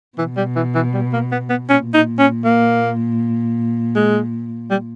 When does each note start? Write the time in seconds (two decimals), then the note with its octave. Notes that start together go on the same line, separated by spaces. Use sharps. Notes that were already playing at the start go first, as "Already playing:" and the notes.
0.18 B2 E3
0.37 G3
0.56 E3
0.75 E3
0.94 G3
1.13 A#3
1.32 B3
1.50 B3
1.69 A#2 C#4
1.94 D#4
2.19 C#4
2.45 A#3
3.95 G#3
4.70 G3